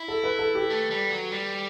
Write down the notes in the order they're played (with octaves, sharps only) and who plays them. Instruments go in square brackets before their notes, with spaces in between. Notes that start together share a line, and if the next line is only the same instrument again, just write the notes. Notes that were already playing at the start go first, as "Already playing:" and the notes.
Already playing: [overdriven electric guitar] E4
[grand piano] A4
B4
A4
G4
[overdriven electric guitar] A3
G3
F#3
G3